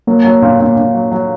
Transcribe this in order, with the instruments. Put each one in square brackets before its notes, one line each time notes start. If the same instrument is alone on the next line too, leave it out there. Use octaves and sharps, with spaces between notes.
[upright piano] F#3 [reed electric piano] A#3
[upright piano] F#3
A#2
A#2
A#2
F#3
F#3